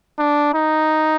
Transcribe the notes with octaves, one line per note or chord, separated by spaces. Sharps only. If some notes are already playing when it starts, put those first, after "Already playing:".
D4
D#4